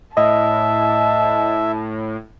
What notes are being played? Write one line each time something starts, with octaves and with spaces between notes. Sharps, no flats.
A2 D#5 E5 A5